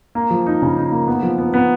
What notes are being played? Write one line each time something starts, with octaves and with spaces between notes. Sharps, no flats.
A#3
F3
D#4
C#3
D#4
A#3
B3
F3
B3
B3